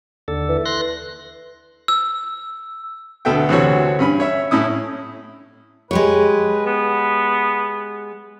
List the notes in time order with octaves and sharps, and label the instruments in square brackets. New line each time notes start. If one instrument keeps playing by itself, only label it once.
[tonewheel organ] D#2 D3 A4
[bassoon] E3
[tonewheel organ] C6 F#6 A#6
[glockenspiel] E6
[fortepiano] D2 B2 B3 A4 E5 G5
D2 C3 E3 C4 F#4 C#5
G2 C#4 B5
C#5 E5
A2 C#4 E4 D#6
[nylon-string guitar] G#3 G4 C#5 [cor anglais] B4
[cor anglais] B3